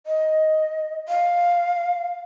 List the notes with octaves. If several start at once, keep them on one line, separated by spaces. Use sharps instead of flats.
D#5
F5